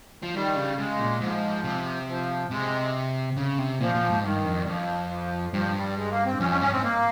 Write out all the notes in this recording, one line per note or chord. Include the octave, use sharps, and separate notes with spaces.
F3
D#3 G3
C#3
C#3 G#3
A#2
G#2 F3
C3
F3
C3 G#3
C#3
C3
A#2 F3
A#2
G#2
G2 D#3
F2
G3
F2 F3
F3
G2 F3
G3
G#3
A#3
C4
F2 C#4
C#4
G2 C#4
G#2 C4
A#3